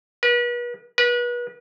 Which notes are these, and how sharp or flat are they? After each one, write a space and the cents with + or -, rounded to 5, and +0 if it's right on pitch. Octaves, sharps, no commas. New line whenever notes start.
B4 -40
B4 -35